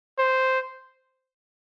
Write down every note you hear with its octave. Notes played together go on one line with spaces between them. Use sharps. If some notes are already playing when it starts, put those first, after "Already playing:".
C5